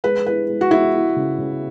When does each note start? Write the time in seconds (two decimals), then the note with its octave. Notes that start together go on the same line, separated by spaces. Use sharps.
0.04 G#3 B4
0.26 E4 B4
0.49 G#3
0.61 F#4
0.71 G#3 E4
0.94 E4
1.16 C#3
1.38 C#3